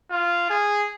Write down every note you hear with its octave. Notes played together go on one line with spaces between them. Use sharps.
F4
G#4